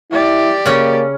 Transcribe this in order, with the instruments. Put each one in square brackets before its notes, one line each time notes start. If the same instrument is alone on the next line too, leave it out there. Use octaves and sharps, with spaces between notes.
[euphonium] E4 [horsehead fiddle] G4 D5
[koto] C#3 C#4 [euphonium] A#3